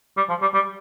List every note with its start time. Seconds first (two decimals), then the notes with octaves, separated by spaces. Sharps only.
0.17 G3
0.29 F3
0.42 G3
0.54 G3